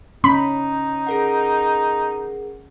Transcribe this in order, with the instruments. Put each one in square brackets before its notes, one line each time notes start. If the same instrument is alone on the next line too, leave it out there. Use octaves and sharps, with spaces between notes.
[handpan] C#4 [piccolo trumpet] D#4 [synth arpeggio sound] B5
[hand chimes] G#4 A#4 F#5